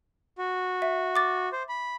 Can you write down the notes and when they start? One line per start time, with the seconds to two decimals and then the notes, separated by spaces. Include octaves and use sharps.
0.38 F#4
0.82 E5
1.16 D6 A6
1.53 C5
1.69 B5